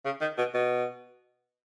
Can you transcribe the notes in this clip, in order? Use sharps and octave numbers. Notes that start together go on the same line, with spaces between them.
C#3
D#3
B2
B2